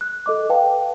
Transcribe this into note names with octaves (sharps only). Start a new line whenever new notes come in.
F#6
A4 D#5 D6
B4 F5 G5 A5